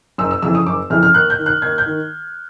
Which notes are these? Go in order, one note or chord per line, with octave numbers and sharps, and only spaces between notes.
F#1 E6
E6
F2 C#3 E3 E6
D#6
F#1 D6
F2 C#3 E3 F6
F6
D#2 F#6
G6
D#3
F#6
D#2 G#6
G6
D#3